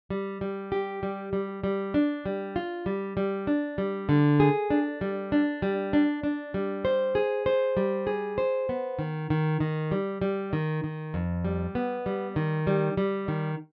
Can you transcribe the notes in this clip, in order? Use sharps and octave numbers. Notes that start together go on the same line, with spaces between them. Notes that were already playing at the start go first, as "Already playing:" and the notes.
G3
G3
G4
G3
G3
G3
D4
G3
F4
G3
G3
D4
G3
D3
G#4
D4
G3
D4
G3
D4
D4
G3
C5
G#4
C5
G3
G#4
C5
B3
D#3
D#3
D#3
G3
G3
D#3
D#3
F2
G3
B3
G3
D#3
G3
G3
D#3